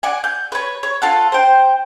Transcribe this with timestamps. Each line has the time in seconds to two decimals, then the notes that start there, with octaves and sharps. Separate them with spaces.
0.03 D5 F#5 G#5
0.24 G6
0.52 B4 C#5
0.83 C#5
1.02 F4 A4 F#5
1.32 C5 G5